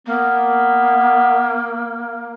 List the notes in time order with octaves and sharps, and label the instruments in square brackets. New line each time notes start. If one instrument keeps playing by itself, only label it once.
[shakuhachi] A#3 [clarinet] B3